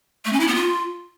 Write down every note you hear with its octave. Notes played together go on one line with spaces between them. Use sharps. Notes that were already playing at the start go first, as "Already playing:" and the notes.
A3
C#4
E4
B3
F4